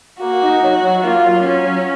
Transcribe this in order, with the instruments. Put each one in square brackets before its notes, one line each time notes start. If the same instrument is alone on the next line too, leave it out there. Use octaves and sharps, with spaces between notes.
[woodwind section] A#3 [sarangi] F#4
[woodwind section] D#4
F#3
F#3
[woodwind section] A#3 [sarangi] F4
[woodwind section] F#3
[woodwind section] F#3 [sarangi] C#4
[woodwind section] F#3